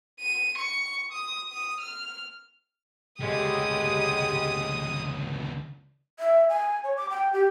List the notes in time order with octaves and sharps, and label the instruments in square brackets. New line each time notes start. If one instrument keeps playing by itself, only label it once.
[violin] D#7
C#6
D#6
D#6
F6
[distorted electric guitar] C#2 D3 [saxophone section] G3 G#3 G4 [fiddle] D#6
[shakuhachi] E5
G#5
C#5
D6
G5
G4